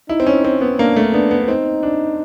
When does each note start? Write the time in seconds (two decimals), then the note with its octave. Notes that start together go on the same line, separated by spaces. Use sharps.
0.09 D#4 E4
0.20 C4
0.27 C#4
0.44 C4
0.61 B3
0.78 A#3 D4
0.96 A3
1.13 B3 D4
1.31 B3
1.48 C4 D#4
1.83 D4